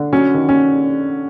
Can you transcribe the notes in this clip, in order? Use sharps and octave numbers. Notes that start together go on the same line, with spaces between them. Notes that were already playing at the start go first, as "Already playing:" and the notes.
Already playing: D3
F#3 C#4
D#3
C#4